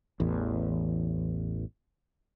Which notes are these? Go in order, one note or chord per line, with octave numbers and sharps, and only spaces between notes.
A1 E2